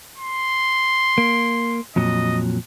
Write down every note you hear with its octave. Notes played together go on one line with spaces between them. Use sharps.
C6
A#3
F2 A#2 F#3 D#5